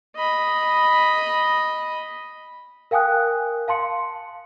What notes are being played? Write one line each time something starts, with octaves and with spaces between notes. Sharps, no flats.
D#5 B5
A#4 F5 G5 G#5 D#6 F#6
F5 A5 C6 C#7